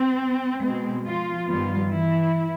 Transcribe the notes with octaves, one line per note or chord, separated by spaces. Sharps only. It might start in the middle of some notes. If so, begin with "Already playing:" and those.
Already playing: C4
B2 G#3 C4
F3 F4
G2 D#3 F3 G3 B3 F4
E3 E4